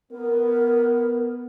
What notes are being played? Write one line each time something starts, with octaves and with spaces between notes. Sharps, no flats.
B3 A#4